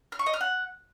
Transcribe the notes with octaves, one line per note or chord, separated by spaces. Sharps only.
F6
C#6
D#5
F6
F#5